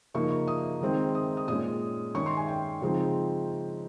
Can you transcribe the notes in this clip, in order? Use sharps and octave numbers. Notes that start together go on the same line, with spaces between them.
C#3 F3 A#3 D#4 C#6
C#6
D#6
D#3 G#3 C4 D#4
D#6
D#6
A#2 G#3 C#4 D#6
D#3 G#3 C#4 C#6
C6
G#5
G5
C#3 F3 G#3 C4 D#4